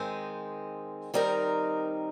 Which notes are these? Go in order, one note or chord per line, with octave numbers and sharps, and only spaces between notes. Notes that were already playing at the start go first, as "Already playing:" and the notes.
Already playing: D#3 G#3 C4
D#3 G3 C4 D#4 A#4